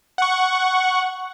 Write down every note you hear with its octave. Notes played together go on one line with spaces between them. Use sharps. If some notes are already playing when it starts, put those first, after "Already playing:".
F#5 C#6